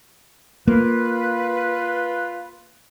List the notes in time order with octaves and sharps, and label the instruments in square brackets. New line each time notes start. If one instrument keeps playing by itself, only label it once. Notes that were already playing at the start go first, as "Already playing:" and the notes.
[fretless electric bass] A#3 [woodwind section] F4 B4